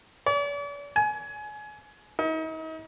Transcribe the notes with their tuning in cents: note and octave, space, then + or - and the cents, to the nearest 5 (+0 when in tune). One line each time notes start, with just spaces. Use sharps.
D5 -45
G#5 +25
D#4 +40